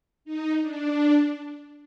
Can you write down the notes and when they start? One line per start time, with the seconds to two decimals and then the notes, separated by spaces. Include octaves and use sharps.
0.25 D#4
0.61 D4